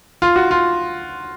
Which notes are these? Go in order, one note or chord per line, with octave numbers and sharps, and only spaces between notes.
F4
F#4
F4